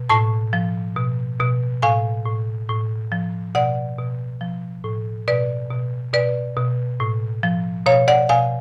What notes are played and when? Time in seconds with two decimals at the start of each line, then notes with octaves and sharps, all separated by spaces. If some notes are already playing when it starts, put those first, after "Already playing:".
Already playing: B2
0.09 A2 A5 C#6
0.53 F3
0.96 B2
1.40 B2
1.82 A2 F5 G#5
2.26 A2
2.69 A2
3.12 F3
3.55 B2 D5 F#5
3.98 B2
4.41 F3
4.84 A2
5.28 B2 B4 D5
5.71 B2
6.14 B2 B4 D5
6.57 B2
7.00 A2
7.43 F3
7.86 B2 C#5 F5
8.08 D5 F#5
8.29 B2 F5 G#5